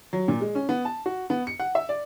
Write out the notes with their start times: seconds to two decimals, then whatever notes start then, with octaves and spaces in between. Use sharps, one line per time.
0.13 F#3
0.28 A#2
0.41 G#3
0.55 C#4
0.69 B3
0.85 A5
1.06 F#4
1.30 B3
1.47 C#7
1.60 F#5
1.75 E5
1.89 D5